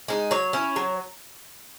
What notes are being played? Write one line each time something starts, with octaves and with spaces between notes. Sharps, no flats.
G#3 D#4
F#3 C#5
C#4 E4
F#3